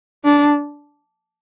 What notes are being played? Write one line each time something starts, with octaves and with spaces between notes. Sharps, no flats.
D4